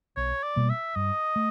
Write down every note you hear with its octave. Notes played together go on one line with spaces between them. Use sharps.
B1 C#5
D5
B2 G3 A#3
E5
G2 D#5
A3